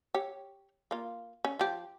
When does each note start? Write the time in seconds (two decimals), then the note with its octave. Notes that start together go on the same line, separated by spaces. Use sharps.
0.14 G4 C#5
0.91 A#3 F4
1.44 C#4
1.59 F3 G4